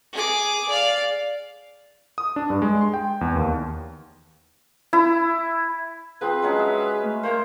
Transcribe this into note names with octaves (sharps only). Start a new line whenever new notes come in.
G#4 D6
D5 F5
D#6
D4
G2
G#3
C6
G5
E2
D#2
E4
F3 C4 G#4 B4
F#3 G#3 C#4
E5
A3
A#3 C5